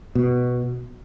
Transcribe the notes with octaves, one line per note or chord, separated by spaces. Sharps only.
B2